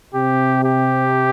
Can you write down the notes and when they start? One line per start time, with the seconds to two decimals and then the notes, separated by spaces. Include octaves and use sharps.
0.14 C3 G4
0.64 G4